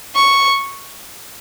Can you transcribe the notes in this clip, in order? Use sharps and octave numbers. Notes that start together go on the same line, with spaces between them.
C#6